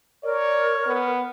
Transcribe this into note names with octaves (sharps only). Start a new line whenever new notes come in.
A#4 C#5 D5
B3